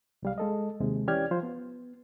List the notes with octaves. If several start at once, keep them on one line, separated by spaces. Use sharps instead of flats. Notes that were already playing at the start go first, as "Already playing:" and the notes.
C2 G3 F5
G#3 A4 D#5
D#2 C3 G#3
E3 C#4 G4 D5 F6 G#6
F3 F4 C5
B3